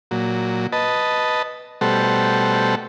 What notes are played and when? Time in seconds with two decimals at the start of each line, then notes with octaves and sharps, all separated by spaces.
0.11 A#2 F#3
0.72 B4 D#5 A5
1.81 B2 G3 A3 A4 C5 F#5